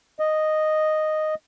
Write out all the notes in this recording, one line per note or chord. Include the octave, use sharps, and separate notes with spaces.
D#5